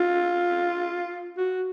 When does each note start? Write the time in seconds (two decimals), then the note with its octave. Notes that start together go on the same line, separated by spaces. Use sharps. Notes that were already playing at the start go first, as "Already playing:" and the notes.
Already playing: F4
1.37 F#4